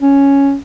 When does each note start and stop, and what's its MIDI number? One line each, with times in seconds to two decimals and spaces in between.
0.01 0.57 61